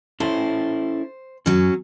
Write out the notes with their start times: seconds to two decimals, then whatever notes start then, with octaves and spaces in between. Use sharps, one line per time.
0.20 C#4 E4 A4 C5
1.46 F#2 F#3 C#4